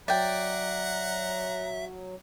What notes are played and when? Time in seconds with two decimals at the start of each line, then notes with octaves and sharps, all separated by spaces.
0.08 F#3 D5 E5 F#5 G5 A#5